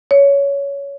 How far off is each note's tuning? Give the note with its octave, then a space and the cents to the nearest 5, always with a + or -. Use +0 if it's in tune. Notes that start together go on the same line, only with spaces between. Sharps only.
C#5 +15